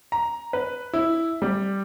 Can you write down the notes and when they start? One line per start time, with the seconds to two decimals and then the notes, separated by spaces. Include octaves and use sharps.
0.12 A#5
0.53 B4
0.93 E4
1.42 G3